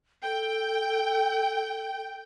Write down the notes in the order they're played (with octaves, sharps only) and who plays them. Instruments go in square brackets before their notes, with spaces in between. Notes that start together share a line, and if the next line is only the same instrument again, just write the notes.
[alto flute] A4 [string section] G5